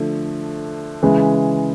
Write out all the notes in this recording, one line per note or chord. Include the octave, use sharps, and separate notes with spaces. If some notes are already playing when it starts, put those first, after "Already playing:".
Already playing: D3 F3 A3
C#3 E3 G#3